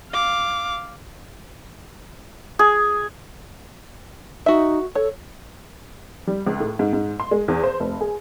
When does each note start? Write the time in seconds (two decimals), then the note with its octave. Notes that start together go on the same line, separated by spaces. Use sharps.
0.12 F5 D6
2.59 G#4
4.46 D#4 F#4 E5
4.95 A4 C#5
6.27 G3
6.47 C#2
6.60 A2
6.79 G#2
6.93 G#2
7.20 C6
7.31 G#3
7.48 E2
7.63 C5
7.80 F1
8.01 G#4